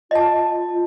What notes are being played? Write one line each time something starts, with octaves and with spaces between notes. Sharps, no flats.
F4 D#5 A5